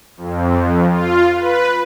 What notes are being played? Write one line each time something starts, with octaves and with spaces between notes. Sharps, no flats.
F2
F4
B4